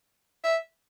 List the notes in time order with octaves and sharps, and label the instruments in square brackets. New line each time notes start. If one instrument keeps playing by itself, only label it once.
[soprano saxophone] E5